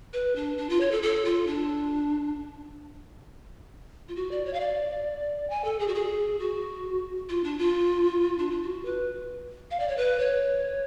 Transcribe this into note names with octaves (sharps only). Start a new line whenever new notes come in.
B4
D4
D4
F4
C#5
A4
A4
F4
D4
F4
F#4
D5
C#5
F5
D5
G#5
A4
G#4
F#4
G#4
F#4
F4
D4
F4
D4
F4
F#4
B4
F5
D5
C#5
B4
C#5